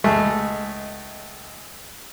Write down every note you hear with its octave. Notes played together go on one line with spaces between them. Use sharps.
C#2 G#3 A3